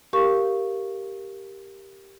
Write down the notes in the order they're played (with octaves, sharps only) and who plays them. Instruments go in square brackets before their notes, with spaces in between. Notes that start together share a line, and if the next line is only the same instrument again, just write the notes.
[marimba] G4 A#4 F5 C#6